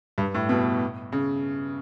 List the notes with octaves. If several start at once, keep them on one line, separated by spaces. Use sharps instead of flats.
G2
A2
B2
C#3